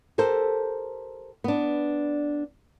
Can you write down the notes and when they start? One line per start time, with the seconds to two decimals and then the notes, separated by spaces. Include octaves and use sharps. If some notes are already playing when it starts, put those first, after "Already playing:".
0.18 G4 A4 A#4 C5
1.44 B3 D4